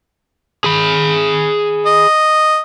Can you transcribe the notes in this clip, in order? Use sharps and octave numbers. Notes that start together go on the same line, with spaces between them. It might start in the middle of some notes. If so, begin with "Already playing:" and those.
G#4 B5
D#5